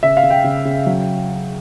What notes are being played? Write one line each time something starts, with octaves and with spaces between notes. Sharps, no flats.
C#3 E5
F5
C#3
G5
C#3
C#3
F#3